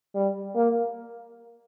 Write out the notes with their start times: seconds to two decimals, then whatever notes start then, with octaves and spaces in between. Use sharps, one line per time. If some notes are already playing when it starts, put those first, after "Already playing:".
0.15 G3
0.55 A#3